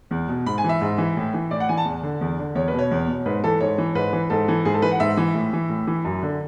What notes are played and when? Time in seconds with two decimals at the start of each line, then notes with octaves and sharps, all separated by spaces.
0.11 E2
0.28 B2
0.46 G#2 B5
0.58 G#5
0.64 E3
0.69 E5
0.81 G#2
0.98 E3
1.17 A2
1.34 E3
1.51 A2 D5
1.60 F#5
1.69 E3 G#5
1.77 A5
1.85 E2
2.03 D3
2.21 E2
2.39 D3
2.55 E2 C#5
2.68 B4
2.73 B2
2.79 C#5
2.91 E2
3.08 B2
3.26 G#2 B4
3.44 E3 A4
3.60 G#2 C#5
3.78 E3
3.95 G#2 B4
4.13 E3
4.30 G#2 A4
4.48 E3
4.65 G#2 G#4
4.74 A4
4.82 E3 B4
4.92 F#5
5.00 G#2 E5
5.17 E3
5.35 A2
5.53 E3
5.69 A2
5.87 E3
6.05 F#2
6.23 D3